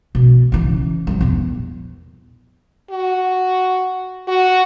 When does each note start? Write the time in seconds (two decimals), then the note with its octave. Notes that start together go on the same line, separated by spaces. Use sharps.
0.15 B2
0.52 C#3 E3
1.07 F3 G3
1.21 E2 A#2
2.91 F#4
4.28 F#4